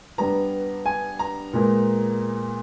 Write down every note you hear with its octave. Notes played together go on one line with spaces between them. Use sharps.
G2 G3 B3 A#5
G#5
A#5
A#2 G#3 B3